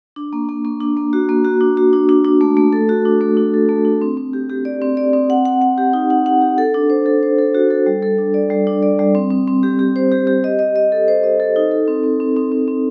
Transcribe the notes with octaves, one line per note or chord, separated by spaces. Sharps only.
D4
A#3
A#3
A#3
D4
A#3
F#4
A#3
F#4
D4
F#4
D4
D4
D4
A3
A3
A4
F#4
D4
A3
D4
A4
A3
D4
C4
C4
G4
G4
D5
C4
D5
C4
F#5
F#5
F#5
G4
D#4
F#5
F#5
G4
A4
D4
C5
A4
C5
A4
F#4
A4
G3
A4
D4
D5
G3
D4
D5
G3
C4
C4
C4
G4
G4
C5
G4
G4
D#5
D#5
D#5
A4
C5
D#5
A4
D#4
A4
C4
C4
C4
C4
C4
C4